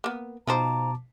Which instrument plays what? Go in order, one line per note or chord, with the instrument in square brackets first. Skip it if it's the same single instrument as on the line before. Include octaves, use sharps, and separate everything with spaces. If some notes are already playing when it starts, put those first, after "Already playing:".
[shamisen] A#3 B3
[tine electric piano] B2 A5 D6 [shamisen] F3 D#4 C5 [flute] A#5